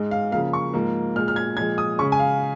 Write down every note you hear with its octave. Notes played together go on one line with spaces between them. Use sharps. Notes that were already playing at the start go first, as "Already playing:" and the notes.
Already playing: G#2 G#3
F5
C#3 F3 A#3 F5
C#6
G#2 F3 A#3
A#2 G#3 F6
F6
G#6
A#2 F3 G#3 G#6
D#6
C#3 G#3 C#6
G#5
F5